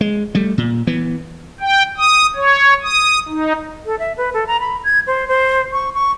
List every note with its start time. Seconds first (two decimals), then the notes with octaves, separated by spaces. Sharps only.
0.01 G#3
0.35 G3 A3
0.58 A#2
0.87 E3 B3
1.60 G5
1.98 D#6
2.35 C#5
2.83 D#6
3.29 D#4
3.86 A4
3.99 E5
4.17 B4
4.34 A4
4.47 A#5
4.60 B5
4.84 G#6
5.07 C5
5.28 C5
5.72 C#6
5.94 C#6